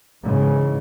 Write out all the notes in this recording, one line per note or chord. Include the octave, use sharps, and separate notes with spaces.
G#2 C#3 E3 G#3